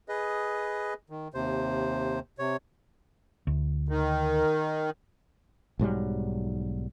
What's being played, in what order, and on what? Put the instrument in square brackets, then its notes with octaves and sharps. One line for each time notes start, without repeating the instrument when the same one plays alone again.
[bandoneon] G#4 B4 D#5
D#3
D#2 C3 C5
C3 C#5
[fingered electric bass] D2
[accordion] D#3
[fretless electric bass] B1 G#2 F#3 G3